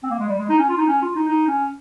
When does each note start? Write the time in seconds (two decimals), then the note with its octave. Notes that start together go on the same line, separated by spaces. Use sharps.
0.03 C4
0.10 A#3
0.19 G#3
0.29 G3
0.39 G#3
0.49 D#4
0.59 C#4
0.69 F4
0.78 D#4
0.88 C#4
1.02 F4
1.15 D#4
1.28 D#4
1.48 C#4